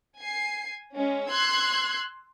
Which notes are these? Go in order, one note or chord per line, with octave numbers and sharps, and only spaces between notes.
G#5 C7
G#3 C#4
C6 E6 F#6 G#6 C7